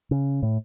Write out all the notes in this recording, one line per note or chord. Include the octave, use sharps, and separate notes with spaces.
C#3
A2